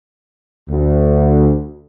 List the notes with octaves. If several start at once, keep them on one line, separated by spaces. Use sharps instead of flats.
D2